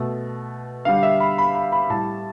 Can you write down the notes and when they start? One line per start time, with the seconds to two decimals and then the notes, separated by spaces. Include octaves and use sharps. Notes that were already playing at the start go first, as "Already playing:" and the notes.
Already playing: B2 A3
0.85 D3 G3 F5
1.03 E5
1.20 B5
1.38 B5
1.55 B5
1.72 B5
1.90 A2 G3 A5